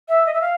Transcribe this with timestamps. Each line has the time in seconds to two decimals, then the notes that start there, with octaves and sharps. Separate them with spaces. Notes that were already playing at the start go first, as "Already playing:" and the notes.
0.08 E5
0.26 D#5
0.33 E5
0.41 F5